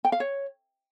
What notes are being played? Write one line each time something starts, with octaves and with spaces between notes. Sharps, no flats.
G5
F5
C#5